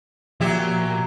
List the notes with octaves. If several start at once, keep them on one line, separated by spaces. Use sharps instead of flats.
A#2 F3 F#3 G4 E5